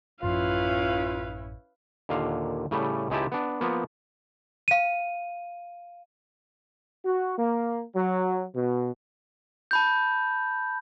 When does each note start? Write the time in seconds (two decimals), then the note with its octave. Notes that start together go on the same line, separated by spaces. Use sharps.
0.23 A1 F#2 F3 C#4 E4 F4 B4 F5
2.09 D#2 A#2 D3 F5
2.71 A2 C#3 G3 A3
3.10 C#2 G#3 D#4 E4 G4 A5
3.32 B3 D4
3.61 F3 A#3 B3
4.68 F5 D#7
7.04 F#4
7.38 A#3
7.95 F#3
8.55 B2
9.71 A5 B5 G6